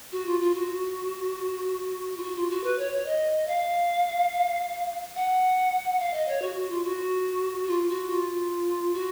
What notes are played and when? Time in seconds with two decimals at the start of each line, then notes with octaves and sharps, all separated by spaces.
0.12 F#4
0.26 F4
0.41 F4
0.54 F#4
2.17 F4
2.22 F#4
2.36 F4
2.50 F#4
2.64 B4
2.78 C#5
2.92 C#5
3.06 D#5
3.47 F5
5.16 F#5
6.00 F5
6.13 D#5
6.28 C#5
6.42 F#4
6.56 F#4
6.70 F4
6.84 F#4
7.68 F4
7.89 F#4
8.10 F4
8.94 F#4